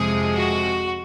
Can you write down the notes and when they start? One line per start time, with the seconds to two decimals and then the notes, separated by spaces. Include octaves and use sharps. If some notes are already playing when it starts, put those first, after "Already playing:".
Already playing: F2 C3 F3 G#3 G#4
0.35 F#4